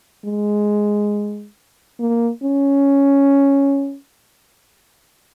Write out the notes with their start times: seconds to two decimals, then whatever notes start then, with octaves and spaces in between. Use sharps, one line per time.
0.25 G#3
2.00 A#3
2.43 C#4